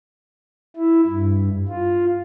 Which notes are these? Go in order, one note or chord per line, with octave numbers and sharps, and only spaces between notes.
E4
G2
F4